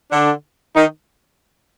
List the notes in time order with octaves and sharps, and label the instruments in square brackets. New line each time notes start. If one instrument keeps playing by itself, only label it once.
[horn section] D3 D4
D#3 D#4